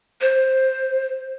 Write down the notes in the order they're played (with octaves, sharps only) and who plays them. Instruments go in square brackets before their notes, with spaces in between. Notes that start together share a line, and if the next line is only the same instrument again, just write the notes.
[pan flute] C5